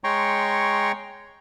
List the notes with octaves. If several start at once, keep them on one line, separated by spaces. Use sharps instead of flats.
G#3 C#5 G5 A#5 C6 C#6